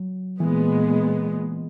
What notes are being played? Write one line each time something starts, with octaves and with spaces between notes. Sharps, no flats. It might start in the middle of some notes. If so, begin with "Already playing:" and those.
Already playing: F#3
A#2 E3 G#3 B3